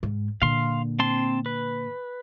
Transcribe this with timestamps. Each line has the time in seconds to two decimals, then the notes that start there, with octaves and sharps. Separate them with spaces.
0.03 G#2
0.42 A#2 D3 F5 C6
0.99 C4 A5 C6
1.46 B4